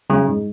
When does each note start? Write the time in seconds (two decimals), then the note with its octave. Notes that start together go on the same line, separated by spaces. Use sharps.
0.09 C#3 F#3 C#4
0.27 G#2